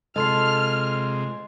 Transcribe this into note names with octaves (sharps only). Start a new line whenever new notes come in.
C3 G#3 F4 A4 D#5 C6 F6 C7